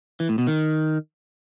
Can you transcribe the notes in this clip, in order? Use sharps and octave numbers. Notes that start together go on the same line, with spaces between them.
E3
A2
B2
D#3